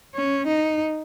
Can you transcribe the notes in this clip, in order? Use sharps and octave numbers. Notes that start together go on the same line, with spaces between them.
C#4
D#4